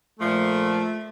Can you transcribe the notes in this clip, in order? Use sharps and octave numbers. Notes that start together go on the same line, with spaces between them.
A#2 F3 A3